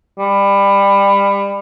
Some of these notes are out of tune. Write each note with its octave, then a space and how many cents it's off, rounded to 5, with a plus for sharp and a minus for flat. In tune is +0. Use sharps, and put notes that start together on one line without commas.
G3 +25